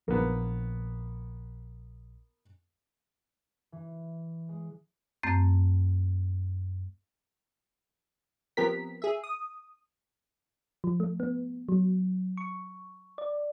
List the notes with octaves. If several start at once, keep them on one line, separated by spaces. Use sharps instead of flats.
A#1 F3 A#3 B3
E3
G#3
F#2 A3 C4 G6
F3 B3 C4 G4 A#4 B6
G#4 E5
D#6
F3
A3
B3
F#3
C#6
D5